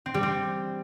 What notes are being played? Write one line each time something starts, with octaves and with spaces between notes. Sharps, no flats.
C4
G3
C4